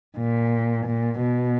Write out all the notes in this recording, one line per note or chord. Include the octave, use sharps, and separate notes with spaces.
A#2
A#2
B2